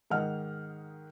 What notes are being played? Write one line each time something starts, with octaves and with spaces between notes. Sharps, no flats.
G#2 D#3 D#5 F#5 F6